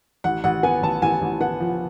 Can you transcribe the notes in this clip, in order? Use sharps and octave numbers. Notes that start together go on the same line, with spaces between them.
A1 F#5
A1 F#5
B3 G#5
A1 A5
A1 G#5
A1
B3 F#5
F3